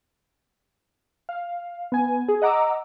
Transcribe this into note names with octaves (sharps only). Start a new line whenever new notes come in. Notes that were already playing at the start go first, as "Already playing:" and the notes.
F5
B3 G#5
G#4
D#5 F#5 A#5 D6 E6